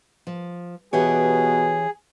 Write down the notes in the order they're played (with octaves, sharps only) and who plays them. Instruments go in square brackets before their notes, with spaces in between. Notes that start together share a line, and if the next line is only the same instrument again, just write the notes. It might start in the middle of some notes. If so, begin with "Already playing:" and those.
[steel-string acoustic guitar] F3
[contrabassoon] B2 [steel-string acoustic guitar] E3 G4 C#5 [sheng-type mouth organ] G#4